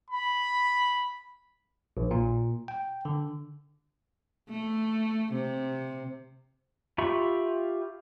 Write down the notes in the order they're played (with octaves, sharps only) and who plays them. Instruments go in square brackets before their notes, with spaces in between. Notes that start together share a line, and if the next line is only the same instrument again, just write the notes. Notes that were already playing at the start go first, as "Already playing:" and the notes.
[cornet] B5
[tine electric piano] A#1
A#2
G5
D3
[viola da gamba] A3
C3
[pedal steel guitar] F4 G4 E5 B5 C#6